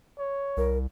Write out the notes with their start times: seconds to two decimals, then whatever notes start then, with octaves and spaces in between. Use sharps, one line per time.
0.19 C#5
0.57 C2 A#4